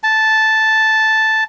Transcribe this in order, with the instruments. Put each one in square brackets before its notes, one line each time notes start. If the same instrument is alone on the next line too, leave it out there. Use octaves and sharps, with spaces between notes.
[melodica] A5